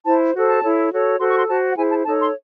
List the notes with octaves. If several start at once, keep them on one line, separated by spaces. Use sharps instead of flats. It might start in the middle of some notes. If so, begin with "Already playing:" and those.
E4 C5 A5
F#4 A4 C5
A5
E4 A4 C#5
F#4 A4 C#5
F#4 A4 C5 C6
C#6
C6
F#4 C5 A5
F#5
E4 G#4 C5 G#5
A5
D#4 A4 C#5 A5
C6